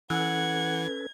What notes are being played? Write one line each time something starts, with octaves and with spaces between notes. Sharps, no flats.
E3 C#4 A4 B4 F#5 G#6